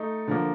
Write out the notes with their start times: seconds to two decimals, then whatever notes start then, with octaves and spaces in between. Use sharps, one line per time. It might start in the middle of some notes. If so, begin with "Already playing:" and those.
Already playing: A3 D#4
0.28 D3 F3 A#3